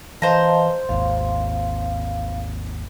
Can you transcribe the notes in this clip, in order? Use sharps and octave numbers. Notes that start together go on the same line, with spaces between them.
E3 C5 D#5 F5 A5 A#5
G#1 D#2 F5